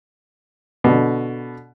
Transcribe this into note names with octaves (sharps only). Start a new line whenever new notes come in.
B2 D3